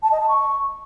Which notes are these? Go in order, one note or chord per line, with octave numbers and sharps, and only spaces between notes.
A5
D#5
A5
C#6